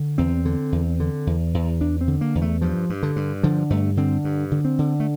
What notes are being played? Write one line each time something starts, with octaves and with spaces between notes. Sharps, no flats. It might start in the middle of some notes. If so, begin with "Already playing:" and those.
Already playing: D3
E2 C4
D3
E2
D3
E2
E2
E2 D4
C4
D3
A#3
E2
A3
G2 F3
G2
D3
G2
D3 F3
G2 A3
D3 C4
G2
D3
C4
D3
A3